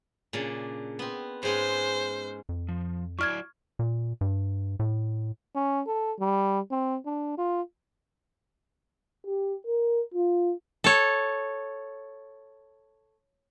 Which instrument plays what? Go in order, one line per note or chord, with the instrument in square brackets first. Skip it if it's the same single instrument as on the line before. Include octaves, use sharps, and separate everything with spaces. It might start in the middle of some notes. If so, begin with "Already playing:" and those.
[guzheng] A#2 C#3 D4
B3 C4
[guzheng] G#2 G#3 C#4 [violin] C5
[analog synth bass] F2
[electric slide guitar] F3
[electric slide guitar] F#3 E4 D5 [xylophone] C#6 F6 G#6
[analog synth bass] A#2
G2
A2
[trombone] C#4
A4
G3
C4
D4
F4
[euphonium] G4
A#4
F4
[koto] A4 C#5